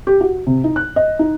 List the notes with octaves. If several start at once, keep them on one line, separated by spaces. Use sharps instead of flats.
G4
F#4
C3
D#4
F#6
D#5
D#4